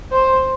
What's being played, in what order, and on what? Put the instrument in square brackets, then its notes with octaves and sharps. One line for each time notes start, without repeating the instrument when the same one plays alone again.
[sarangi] C5